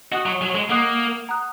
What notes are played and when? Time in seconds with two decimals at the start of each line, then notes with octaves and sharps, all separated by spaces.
0.12 F#4 D#5 F#5 D#6 F#6
0.26 F#3
0.41 F#3
0.55 G#3
0.70 A#3 D#5 F#5 D#6 F#6
1.29 F#5 A#5 D#6 F#6